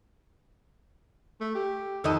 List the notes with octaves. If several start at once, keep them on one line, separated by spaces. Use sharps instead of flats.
A3
G4
F2 D#3 A4 D#5